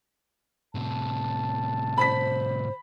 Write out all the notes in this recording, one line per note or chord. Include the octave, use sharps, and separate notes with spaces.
A2 C3 A5
C5 B5 B6